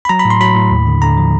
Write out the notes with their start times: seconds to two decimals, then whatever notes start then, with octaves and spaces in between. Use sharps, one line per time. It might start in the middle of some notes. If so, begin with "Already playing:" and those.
0.05 B5
0.09 F#3 A#5
0.19 B5
0.25 A2
0.30 C6
0.40 F#3 B5
0.55 A2
0.71 D#2
0.87 D3
1.02 D3 A#5
1.18 F3